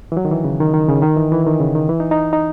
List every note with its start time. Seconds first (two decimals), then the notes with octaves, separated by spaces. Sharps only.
0.12 E3
0.17 F#3
0.25 D#3
0.31 E3
0.44 C#3
0.60 D#3
0.74 D#3
0.89 C#3
1.02 D#3
1.16 E3
1.32 E3
1.46 D#3
1.60 C#3
1.75 D#3
1.89 E3
2.00 D#4
2.11 D#4
2.33 D#4